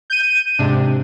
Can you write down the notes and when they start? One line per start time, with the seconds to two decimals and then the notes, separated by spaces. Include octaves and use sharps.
0.10 G6 D#7
0.59 G#2 C3 D4